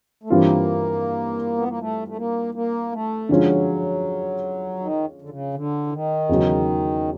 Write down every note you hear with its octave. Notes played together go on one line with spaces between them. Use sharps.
A3
G2 E3 G3 A#3 C4 F4
B3
A#3
A3
A3
A#3
A#3
A3
D3 F3 F#3 G#3 C#4 F4
D#3
D3
C#3
D3
E3
D#3
E2 C#3 F#3